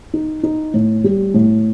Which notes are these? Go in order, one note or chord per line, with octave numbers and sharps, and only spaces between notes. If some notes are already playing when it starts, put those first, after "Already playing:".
D#4
D#4
A2
G3
A2